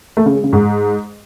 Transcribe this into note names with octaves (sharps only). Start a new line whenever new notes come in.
A3
C#3
G#3
C#3
G#2